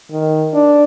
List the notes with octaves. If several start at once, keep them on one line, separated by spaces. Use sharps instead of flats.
D#3
D4